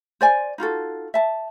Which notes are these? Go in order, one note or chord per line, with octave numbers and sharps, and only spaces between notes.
C5 D5 G#5
D#4 F4 F#4 A4
E5 A5